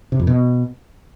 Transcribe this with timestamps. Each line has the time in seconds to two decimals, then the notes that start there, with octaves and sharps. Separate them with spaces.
0.12 C3
0.20 F2
0.27 B2